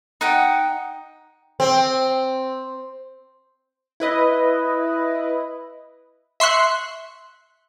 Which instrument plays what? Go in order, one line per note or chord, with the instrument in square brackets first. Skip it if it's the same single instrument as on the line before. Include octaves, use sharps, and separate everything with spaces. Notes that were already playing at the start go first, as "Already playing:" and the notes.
[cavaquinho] D#4 F#5 G5
[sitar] C4
[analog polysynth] E4 B4 D#5
[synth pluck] E5 C6 C#6 F#6